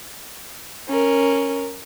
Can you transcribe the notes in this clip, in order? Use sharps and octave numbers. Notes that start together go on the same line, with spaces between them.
C#4 A#4